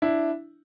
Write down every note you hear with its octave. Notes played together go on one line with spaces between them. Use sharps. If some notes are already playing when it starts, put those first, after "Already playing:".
D4 E4